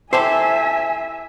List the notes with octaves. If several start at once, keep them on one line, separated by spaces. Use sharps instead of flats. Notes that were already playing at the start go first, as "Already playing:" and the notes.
E4 G4 A4 C5 E5 G#5